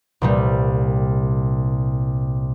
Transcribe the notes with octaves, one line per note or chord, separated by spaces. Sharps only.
C2 A#2 G3